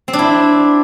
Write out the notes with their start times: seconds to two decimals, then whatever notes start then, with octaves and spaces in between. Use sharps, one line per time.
0.08 C4
0.13 D4
0.19 E4